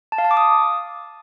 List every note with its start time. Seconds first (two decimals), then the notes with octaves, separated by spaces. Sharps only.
0.12 A5
0.18 F5
0.25 A5
0.31 D6
0.37 D#6